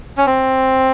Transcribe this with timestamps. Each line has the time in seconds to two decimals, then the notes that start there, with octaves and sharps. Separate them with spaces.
0.17 C#4
0.27 C4